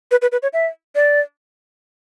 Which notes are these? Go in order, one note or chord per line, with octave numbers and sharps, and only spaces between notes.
B4
B4
B4
C#5
E5
D5